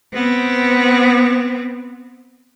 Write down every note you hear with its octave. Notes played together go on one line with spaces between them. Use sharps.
B3 C4